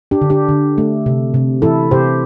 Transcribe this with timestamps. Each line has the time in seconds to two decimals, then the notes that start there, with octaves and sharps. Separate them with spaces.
0.11 D4 G4
0.21 D3
0.30 D4 G4
0.49 D3
0.78 A3
1.06 C3
1.34 C3
1.62 E3 E4 A4
1.91 C3 G4 C5